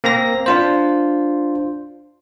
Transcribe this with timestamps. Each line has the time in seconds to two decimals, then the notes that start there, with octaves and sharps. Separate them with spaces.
0.04 A#3 C4 A#5 A#6
0.46 D4 F4 C5